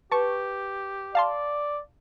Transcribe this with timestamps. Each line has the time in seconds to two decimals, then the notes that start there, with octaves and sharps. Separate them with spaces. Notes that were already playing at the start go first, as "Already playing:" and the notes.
0.12 G4 B4 A5 C#6
1.15 D5 F5 A5 C6